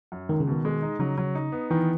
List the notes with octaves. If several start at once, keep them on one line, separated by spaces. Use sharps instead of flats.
F#2
C#2 D#3
C#3
B2 D#3
G#3
D#4
C#3 F#3
F#3
D#4
B3
D#3 E3